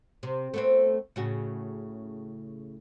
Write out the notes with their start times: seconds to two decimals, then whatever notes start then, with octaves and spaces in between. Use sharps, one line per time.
0.23 C3
0.54 A3 B3 C4
1.16 A2 C#3 F#4